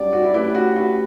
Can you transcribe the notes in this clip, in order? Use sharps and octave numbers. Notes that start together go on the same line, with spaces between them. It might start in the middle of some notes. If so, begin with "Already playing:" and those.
Already playing: G2 F#3 C#4 G4 D5
F#4
E4
A3 C#4 E4 G4 B4
F#4
F#4